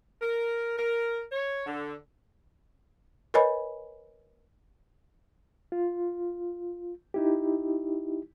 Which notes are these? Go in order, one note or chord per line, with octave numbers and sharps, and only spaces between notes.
A#4
A#4
C#5
D3
A#4 B4 C#5 D#5 G#5 B5
F4
D#4 E4 G4